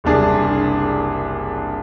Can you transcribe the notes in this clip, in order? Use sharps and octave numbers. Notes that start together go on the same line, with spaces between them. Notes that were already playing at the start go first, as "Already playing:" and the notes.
F#1 C2 D4 G#4